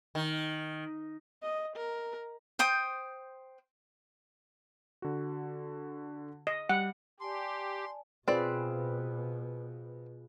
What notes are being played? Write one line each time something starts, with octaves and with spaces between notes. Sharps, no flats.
D#3
D#5
A#4
C5 G5 D#6
D3 F#4
D#5
G3 F#5
G4 D5 G#5 A5 C6
B2 C4 F4 G#4 B4 D5